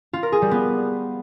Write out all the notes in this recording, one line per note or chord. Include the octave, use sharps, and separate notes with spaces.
F4
A#4
G#4
G3
B3